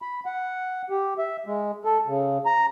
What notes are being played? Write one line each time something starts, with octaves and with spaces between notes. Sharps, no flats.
B5
F#5
G4
E5
G#3
A4
C#3
A#5